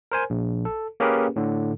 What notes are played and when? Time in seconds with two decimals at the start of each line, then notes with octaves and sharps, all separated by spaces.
0.12 A#4 C5 G#5
0.30 A#1
0.65 A4
1.00 A#3 C#4 G4 G#4 A#4 B4
1.36 A2 D3